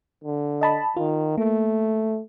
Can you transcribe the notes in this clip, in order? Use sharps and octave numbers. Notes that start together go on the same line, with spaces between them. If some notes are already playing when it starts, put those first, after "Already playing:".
D3
D#5 A5 B5
D#3 F4
A3 A#3